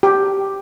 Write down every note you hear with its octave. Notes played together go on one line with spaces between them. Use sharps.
G4